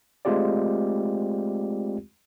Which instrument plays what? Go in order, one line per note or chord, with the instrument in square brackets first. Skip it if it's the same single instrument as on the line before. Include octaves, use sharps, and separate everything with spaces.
[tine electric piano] G#3 A3 C4 F4 G4 D5